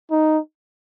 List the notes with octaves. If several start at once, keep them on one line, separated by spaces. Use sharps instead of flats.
D#4